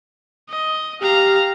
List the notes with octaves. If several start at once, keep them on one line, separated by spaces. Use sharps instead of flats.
D#5
G4 F5 A#5